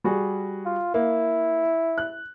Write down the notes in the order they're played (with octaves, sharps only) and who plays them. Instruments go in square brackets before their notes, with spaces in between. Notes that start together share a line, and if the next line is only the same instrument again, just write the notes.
[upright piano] G3 F#4 G#4
[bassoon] F4
[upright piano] A#3 [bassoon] E4
[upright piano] F#6